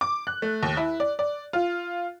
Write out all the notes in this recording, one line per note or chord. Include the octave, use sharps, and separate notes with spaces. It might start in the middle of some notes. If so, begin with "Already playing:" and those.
D6
F#6
A3
D#2
E4
D5
D5
F4